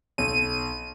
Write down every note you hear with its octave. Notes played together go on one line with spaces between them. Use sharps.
B1 D#7